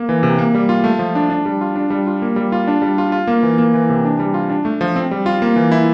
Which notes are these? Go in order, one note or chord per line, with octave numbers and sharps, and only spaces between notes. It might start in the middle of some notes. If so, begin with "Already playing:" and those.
Already playing: A#3
E3
C3
A#3
G3
F4
A3
F3
D4
D4
G3
F4
D4
G3
F4
A#3
G3
F4
D4
G3
F4
F4
A#3
E3
A#3
E3
C3
D4
G3
F4
D4
A3
F3
C4
G3
F4
A#3
E3
E4